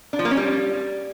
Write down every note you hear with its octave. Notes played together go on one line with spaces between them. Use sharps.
D4
F3
A#3
C#4
G3